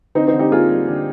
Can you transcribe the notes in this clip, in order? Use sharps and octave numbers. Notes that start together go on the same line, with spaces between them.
D3 C4 D#4
C4 D#4
D3
D#4 G4
A#3 F4 G#4
G3
D3